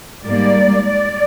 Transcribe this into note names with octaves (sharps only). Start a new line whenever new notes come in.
G#2 G3 A#3 D5
D5